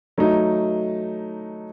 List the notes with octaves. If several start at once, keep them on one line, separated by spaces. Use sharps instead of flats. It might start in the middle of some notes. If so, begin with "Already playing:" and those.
F#3 A3 D#4